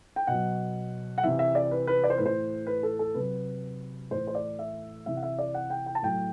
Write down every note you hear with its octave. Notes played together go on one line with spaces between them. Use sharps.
G5
B2 F#3 F#5
F#5
C3 E3 E5
E5
D5
B4
B4
D5
C5
A2 E3 B4
C5
B4
A4
A4
C3 F#3 B4
A2 E3 C5
C5
D5
E5
C3 E3 E5
F#5
E5
D5
F#5
G5
G5
A5
A2 F#3 G5